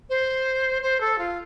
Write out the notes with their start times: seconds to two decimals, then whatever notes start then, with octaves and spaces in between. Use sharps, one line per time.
0.09 C5
0.82 C5
1.00 A4
1.18 F4